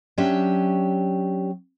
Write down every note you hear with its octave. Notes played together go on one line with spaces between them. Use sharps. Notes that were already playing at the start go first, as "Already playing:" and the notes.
F#3 C#4 D4 G4 E5